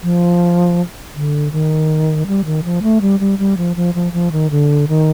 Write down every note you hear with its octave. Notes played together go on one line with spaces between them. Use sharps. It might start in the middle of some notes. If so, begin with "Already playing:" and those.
F3
D3
D#3
G3
D#3
F3
A3
G3
G3
G3
F3
F3
F3
F3
D#3
D3
D#3